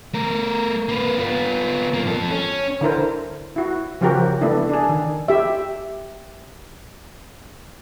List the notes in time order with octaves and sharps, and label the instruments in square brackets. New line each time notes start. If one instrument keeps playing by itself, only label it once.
[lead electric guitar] A3 A#4
A#3 B4
B3 F4
F#2 A#3
F3 A4
C#4
[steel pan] D3 E4 A#4 C5
E4 F#4
C#3 F3 C#4 F#4 G4 A#4
A3 B3 D4 E4
D4 G#4
D#3
G4 E5